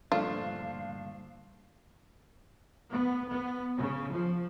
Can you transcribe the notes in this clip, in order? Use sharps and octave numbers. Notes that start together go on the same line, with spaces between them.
G2 A#2 D3 F3 A3 D4 F4 F5
B3
B3
C#3
F3